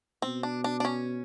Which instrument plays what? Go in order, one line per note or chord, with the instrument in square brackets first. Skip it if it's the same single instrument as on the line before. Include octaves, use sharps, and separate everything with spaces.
[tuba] B2 [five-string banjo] C4
[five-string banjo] D4
D4
D4
C#4